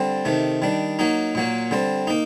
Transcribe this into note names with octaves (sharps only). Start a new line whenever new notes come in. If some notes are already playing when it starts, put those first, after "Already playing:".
Already playing: D3 G3 C4
C3 D#3 A3
D#3 G3 D4
F#3 A#3 D#4
A#2 F#3 A#3
D3 G3 C4
A#3 D#4